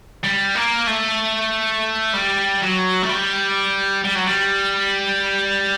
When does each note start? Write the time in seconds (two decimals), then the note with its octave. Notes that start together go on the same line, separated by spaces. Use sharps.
0.24 G3
0.55 A#3
0.87 A3
2.14 G3
2.61 F#3
3.02 A3
3.09 G3
4.04 G3
4.15 F#3
4.26 G3